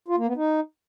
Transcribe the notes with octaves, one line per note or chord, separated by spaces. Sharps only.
F4
A#3
B3
D#4